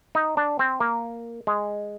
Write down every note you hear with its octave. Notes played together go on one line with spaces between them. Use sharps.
D#4
D4
C4
A#3
G#3